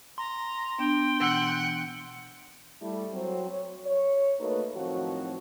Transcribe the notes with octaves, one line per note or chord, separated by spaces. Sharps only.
A#5 C6
B3 D4 G5
B2 E3 F#5 E6
G3 A3 E4
F#3 C4
C#5
C#5
A3 A#3 D#4 F#4 A4 B4
A2 D#3 F3 F#3 C4 F#4